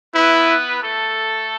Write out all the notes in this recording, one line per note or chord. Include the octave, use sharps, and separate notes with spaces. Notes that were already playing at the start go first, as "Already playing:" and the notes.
B3 E4 B4
A3 A4